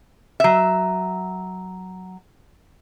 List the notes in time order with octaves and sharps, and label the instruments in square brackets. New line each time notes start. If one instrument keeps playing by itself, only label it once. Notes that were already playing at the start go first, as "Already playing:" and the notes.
[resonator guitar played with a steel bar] F#3 E5